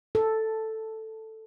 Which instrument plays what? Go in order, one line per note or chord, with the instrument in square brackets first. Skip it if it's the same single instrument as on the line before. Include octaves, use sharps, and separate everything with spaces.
[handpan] A4